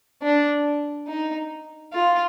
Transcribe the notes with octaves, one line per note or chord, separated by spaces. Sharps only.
D4
D#4
F4